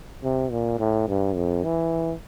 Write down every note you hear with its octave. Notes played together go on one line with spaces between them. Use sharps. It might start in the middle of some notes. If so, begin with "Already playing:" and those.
C3
A#2
A2
G2
F2
E3